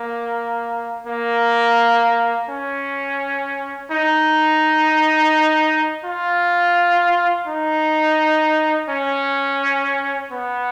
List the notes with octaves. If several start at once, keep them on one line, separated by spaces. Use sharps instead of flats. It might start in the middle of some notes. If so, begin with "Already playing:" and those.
Already playing: A#3
A#3
C#4
D#4
F4
D#4
C#4
B3